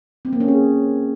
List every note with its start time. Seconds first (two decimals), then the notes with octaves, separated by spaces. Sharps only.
0.25 C4
0.33 A#3
0.40 C#4
0.48 G#4